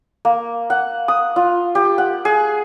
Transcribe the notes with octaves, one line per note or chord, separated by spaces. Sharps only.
A#3
F#5
D#6
F4
G4
F#5
G#4